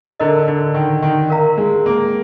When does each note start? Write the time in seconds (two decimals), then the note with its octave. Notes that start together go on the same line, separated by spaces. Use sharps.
0.20 D3 A#4 D#5 A#5
0.48 D3
0.74 D#3
1.02 D#3
1.30 A#4 F5 A#5
1.57 G#3
1.86 A#3